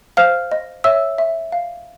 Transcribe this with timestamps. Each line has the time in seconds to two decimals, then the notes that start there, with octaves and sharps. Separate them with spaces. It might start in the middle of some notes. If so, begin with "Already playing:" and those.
0.17 C5 F5 F6
0.52 D#5
0.84 C#5 E5 E6
1.18 E5
1.52 F5